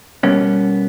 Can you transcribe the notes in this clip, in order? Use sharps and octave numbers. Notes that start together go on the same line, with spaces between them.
B2 G3 A#3 B3 C#4